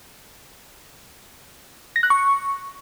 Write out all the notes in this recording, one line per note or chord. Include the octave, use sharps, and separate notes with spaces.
A#6
F#6
C#6